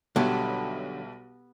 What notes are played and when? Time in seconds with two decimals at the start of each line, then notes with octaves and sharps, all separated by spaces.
0.16 B1 D3 F#3 G3 B3 G4 E5